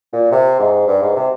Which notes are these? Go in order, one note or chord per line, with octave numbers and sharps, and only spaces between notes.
A#2
C3
G#2
G2
G#2
C3